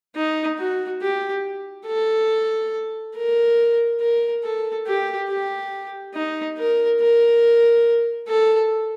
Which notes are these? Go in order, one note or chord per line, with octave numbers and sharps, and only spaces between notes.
D#4
F#4
G4
A4
A#4
A#4
A4
G4
G4
D#4
A#4
A#4
A4